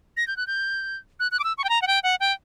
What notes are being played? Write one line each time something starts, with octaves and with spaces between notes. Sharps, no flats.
A#6
G6
F#6
G6
F#6
F#6
D6
E6
C#6
G5
A#5
F#5
G5
F#5
G5